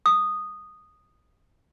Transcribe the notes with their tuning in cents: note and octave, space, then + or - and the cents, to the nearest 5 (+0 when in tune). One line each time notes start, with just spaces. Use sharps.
D#6 -10